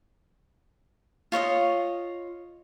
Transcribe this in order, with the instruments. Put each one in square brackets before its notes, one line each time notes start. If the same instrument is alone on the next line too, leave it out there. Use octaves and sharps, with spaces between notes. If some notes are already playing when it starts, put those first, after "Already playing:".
[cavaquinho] F4 C#5 D#5 D#6